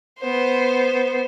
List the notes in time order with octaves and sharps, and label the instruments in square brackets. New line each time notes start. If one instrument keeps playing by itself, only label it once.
[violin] B3 C5